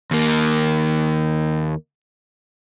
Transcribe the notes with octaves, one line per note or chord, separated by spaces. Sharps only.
D#2 A#3